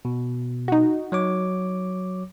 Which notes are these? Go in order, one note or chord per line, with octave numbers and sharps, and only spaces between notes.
B2
D#4 F#4
F#3 C#5 D6